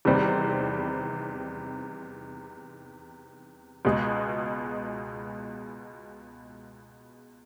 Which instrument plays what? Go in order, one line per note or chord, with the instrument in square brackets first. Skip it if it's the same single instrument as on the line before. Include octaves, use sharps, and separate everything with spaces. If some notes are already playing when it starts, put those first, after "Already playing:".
[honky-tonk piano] E2 C3 D#3 G3 C4
C#2 B2 G#3